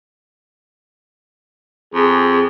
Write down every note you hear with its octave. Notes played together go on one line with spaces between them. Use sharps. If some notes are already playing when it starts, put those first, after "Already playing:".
F2 G#4